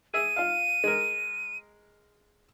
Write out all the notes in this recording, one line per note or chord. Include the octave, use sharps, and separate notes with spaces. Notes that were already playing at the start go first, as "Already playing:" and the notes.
G#4 E5 D#7
F4 F5
G#3 A#4